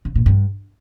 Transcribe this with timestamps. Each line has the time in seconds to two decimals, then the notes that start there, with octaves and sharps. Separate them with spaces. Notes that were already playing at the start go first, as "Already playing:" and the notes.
0.05 C#3
0.15 A#2
0.26 G2